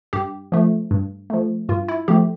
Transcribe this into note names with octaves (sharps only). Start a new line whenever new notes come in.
G2 G4
F3 A3
G2
F3 A3
G2 F4
E4
F3 A3 G4